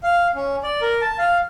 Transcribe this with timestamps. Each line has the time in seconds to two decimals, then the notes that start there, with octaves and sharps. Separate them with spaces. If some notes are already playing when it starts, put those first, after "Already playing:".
0.03 F5
0.35 C#4
0.63 D5
0.81 A#4
1.01 A5
1.19 F5